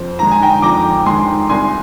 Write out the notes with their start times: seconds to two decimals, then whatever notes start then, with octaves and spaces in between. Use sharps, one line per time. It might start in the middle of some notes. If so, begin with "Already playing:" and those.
Already playing: F2 C5
0.19 D#3 G#3 A#5
0.31 G#5
0.42 G5 A#5
0.62 F2 A#5 D6
1.06 D#3 G#3 G#5 C6
1.49 C2 G#5 C6